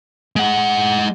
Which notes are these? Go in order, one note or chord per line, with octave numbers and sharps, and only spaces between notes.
G#3 F#5